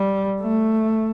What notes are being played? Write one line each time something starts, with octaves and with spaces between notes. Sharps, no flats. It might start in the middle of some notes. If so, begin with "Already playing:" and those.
Already playing: G3
A3